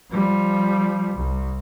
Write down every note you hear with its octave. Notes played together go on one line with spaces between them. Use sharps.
F3 G3
C2